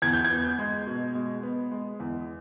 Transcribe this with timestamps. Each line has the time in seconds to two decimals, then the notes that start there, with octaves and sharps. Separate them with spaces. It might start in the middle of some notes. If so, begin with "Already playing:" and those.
0.02 E2 G#6
0.13 G6
0.25 G#6
0.30 B3
0.59 G#3
0.87 B2
1.15 G#3
1.43 B3
1.72 G#3
2.00 E2